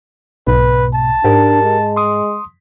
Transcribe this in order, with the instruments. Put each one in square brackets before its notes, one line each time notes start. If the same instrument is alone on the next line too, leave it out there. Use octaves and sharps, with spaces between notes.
[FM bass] B1 [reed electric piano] G#2 B2 [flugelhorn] B4
[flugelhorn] A5
[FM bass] G#2 [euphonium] D4 [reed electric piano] G4 A#4
[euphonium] G#3
[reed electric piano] C6 D#6